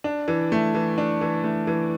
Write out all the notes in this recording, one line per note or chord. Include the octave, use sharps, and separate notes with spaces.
D4
E3
A3
E3
D4
E3
A3
E3